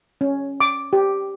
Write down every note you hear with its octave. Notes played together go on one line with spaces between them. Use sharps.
C#4
D6
G4